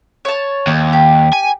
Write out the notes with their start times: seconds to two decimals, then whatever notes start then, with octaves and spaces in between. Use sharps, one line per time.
0.25 C#5 A5
0.67 D#2
0.93 G4
1.33 G#5